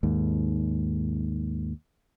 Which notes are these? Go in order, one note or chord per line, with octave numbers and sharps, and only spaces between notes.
D#2 G#2